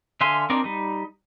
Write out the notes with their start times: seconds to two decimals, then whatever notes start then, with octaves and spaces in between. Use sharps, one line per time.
0.21 D3 E5 F5 G#5 C6
0.50 C4 D4 D#4 A#4 D5
0.64 G3 D#4